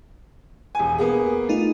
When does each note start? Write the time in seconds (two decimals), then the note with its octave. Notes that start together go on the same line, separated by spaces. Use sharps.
0.75 E1 G#5
0.98 A#3 B3 G#4
1.49 A3 D#4 F4